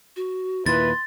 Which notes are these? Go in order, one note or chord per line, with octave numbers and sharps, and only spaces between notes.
F#4
D#2 A#2 E4 B4 C6 A6